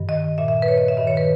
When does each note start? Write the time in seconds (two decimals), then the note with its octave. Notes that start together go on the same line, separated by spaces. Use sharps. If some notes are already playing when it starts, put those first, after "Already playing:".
Already playing: G2 D#3
0.09 D#5
0.38 A#2 E5
0.48 E5
0.62 B4
0.68 C#5
0.78 D#5
0.88 E5
0.97 G2 D#3 D#5
1.07 C#5
1.17 B4